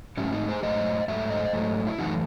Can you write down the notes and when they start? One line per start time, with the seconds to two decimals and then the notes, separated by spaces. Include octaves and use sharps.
0.17 G#2 F#3 A3 C#4 E4
0.32 C4 D#4
0.48 G#4 C5
0.62 G#2 F#3 A3 C5 D#5
1.08 G#2 F#3 A3 E5
1.30 C5 D#5
1.53 G#2 F#3 A3
1.87 E4
1.99 F#2 E3 A3 D#4 F#4